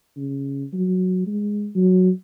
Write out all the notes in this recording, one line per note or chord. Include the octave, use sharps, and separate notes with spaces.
C#3
F#3
G#3
F#3